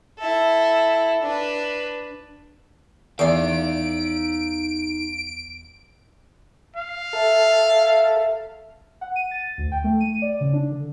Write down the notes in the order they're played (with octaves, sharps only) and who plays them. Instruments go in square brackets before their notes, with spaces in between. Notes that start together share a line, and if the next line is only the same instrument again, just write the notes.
[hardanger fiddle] E4 A4
D4 B4
[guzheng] E2 D5 [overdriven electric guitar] D#4 F5 [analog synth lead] D7
[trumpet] F5
[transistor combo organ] A4 [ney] E5
[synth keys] F#5
D#7
A6
D2
G5
A3
D#7
D5
C#3
D4
D3